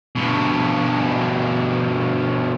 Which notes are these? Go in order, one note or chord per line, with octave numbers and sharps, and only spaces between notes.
G2 B2